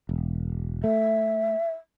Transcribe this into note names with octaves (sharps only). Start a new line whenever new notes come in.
E1
A3 E5